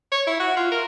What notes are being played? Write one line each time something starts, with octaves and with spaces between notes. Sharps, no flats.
C#5
E4
F#4
F4
A#4